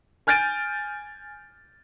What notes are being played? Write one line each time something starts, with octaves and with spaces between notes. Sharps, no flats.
G#5 F6 G6 A6 D7 D#7